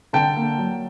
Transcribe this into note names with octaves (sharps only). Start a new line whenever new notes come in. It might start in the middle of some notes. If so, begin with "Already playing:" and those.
D3 G5 A5
A#3
F#3